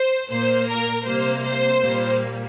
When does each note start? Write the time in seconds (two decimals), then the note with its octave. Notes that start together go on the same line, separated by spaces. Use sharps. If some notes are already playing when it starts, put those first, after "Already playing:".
Already playing: C5
0.30 A#2 A#3 C5
0.68 A#4
1.06 C3 G3 A#3 C5
1.44 C5
1.82 A#2 G3 A#3